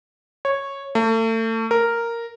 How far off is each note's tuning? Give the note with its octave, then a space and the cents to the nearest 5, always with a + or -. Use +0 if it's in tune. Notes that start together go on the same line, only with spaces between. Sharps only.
C#5 -10
A3 +35
A#4 -5